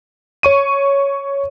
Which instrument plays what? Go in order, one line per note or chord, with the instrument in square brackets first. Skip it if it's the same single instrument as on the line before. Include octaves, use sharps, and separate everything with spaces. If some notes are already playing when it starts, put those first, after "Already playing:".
[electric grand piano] C#5 C#6 D#7